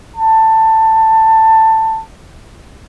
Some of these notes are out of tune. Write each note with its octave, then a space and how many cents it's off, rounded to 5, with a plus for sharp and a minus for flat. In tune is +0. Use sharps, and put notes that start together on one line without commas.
A5 +15